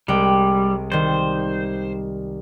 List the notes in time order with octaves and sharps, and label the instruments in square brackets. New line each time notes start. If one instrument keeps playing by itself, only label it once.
[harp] C2 G#3 G5 [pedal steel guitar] G3
[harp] D#3 G3 [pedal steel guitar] C5